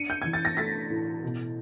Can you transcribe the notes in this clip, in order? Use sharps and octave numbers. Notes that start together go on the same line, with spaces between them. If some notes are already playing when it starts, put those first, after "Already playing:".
Already playing: D4 C#7 D#7
G6
E3 G#6
A6
A#6
A3 A6 B6
A2
B2